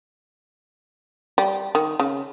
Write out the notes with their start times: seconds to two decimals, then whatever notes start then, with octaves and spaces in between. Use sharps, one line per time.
1.38 G3
1.75 D#3
2.00 C#3